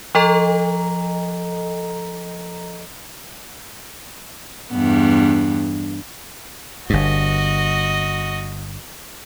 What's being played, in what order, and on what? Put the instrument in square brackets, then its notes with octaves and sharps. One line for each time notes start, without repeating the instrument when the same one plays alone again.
[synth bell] F3 A4 D#5 A#5
[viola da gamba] E2 G2 B3
[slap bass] G1 G2 [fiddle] F#4 D#5